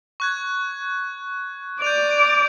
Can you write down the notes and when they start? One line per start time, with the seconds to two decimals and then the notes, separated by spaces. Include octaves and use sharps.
0.20 C#6 F#6 G#6
1.82 D5 G6 D#7 F7